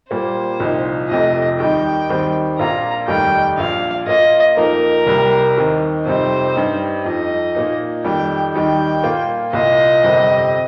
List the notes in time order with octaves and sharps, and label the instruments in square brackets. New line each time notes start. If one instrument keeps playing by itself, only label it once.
[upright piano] A#2 G3 A#3 [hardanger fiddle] C5
[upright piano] C2 A#2 F3 D#4
[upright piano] F1 F2 C3 F3 [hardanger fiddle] D#5
[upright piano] D#2 D#3 G3 D#4 [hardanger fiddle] G5
[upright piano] D#2 D#3 G3 C4
[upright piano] A#1 A#2 A#3 F4 [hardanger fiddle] A#5
[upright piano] F1 D#2 D#3 G3 [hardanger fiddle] G5
[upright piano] A#1 A#2 F3 [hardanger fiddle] F5
[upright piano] A#2 A#3 F4 [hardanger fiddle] D#5
[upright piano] F2 F3 A#3 D#4 [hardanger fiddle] A#4
[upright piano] C2 C3 G3
D#2 D#3 C4
[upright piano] F2 C3 G3 D#4 [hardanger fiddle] C5
[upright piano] G2 G3 D#4
[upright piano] F2 F3 D#4 [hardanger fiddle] D#5
[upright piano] A#2 A#3 D#4
[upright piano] F2 D#3 G3 [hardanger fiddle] G5
[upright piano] D#2 D#3 G3 D#4 [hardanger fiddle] G5
[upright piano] A#2 A#3 F4
[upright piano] C2 A#2 A#3 F4 [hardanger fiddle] D#5
[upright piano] G1 F2 C3 G3 C4